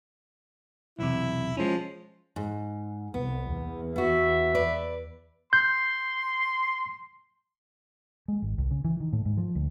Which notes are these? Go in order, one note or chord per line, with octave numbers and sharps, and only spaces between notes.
B1 E2 C3 E4
F3 G#3 C#4
G#2
C2 B3
E2
B3 F#4 E5
B4 D5
C6 G6
G#3
G#1
C2
C#3
E3
D#3
A2
G#2
F3
D2